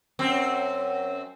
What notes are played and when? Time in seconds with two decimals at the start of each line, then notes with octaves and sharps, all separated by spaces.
0.19 F#2 C4